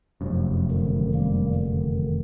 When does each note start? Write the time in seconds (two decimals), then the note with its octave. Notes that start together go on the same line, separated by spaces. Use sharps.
0.21 F1 F#2
0.71 F2 D3 D#3
1.15 D#3 G3 A#3
1.55 D3 D#3